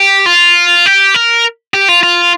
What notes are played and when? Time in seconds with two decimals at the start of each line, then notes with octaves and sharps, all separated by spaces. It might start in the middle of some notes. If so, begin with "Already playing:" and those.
Already playing: G4
0.26 F4
0.86 G4
1.14 A#4
1.74 G4
1.88 F4
2.03 F4